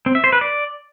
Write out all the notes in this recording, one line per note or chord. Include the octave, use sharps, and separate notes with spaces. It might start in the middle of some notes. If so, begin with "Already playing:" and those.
C4
E5
C5
B4
D5